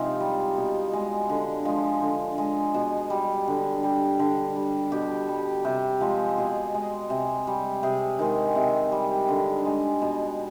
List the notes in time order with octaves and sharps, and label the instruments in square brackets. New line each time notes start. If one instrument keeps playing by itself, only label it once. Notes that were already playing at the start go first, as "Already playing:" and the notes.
Already playing: [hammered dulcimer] C3 F3 G#3 D#4 F4
G3
B2
G#3
D3
F3 G#3
D3
G#3
B2 G#4
G3
D3
G3
D3
G3
B2 G4
G3
C3
F3 G#3
B2 G#4
G#3
C3
G3
C3 G#4
D#3 G#3
C3
G3
D3
G#3
B2